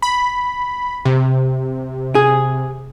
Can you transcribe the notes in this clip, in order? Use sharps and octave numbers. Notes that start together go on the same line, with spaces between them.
B5
C3
G#4